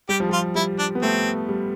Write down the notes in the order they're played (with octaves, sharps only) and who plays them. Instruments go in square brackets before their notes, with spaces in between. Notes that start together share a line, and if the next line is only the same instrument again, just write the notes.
[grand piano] G3 [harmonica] G4
[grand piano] F3
[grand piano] G3 [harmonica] F4
[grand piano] G3 [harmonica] E4
[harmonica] D4
[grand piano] B3
[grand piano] A3 [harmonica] C4
[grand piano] G3